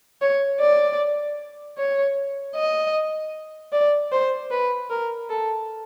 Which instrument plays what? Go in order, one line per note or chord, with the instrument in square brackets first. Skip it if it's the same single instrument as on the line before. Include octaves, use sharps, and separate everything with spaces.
[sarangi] C#5
D5
C#5
D#5
D5
C5
B4
A#4
A4